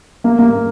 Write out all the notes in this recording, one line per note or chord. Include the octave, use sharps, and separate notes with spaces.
A#3
A#3